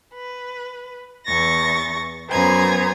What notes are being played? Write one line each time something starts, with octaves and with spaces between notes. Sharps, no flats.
B4
E2 C#6 A6 A#6
F#2 B3 C5 G#5 A#5 G#6